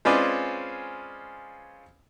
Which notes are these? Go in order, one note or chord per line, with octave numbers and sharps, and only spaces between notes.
G#3 C4 C#4 F4 B4 D5